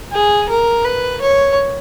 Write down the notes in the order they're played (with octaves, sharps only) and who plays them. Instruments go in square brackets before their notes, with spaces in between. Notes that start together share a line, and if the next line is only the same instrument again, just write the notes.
[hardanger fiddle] G#4
A#4
B4
C#5